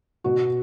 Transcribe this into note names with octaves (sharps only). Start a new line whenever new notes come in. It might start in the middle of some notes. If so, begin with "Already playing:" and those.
B2 F#4